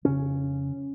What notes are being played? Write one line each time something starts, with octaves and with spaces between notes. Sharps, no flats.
F2 C#3 C#4